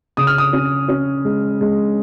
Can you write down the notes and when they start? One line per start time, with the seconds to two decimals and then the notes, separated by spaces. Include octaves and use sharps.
0.17 C#3 D#6
0.27 F6
0.38 D#6
0.53 C#4
0.89 C#4
1.25 G#3
1.61 G#3